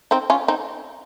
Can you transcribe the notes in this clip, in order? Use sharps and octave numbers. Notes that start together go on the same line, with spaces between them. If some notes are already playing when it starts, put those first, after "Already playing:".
C4 D#4
C#4 F4
C4 D#4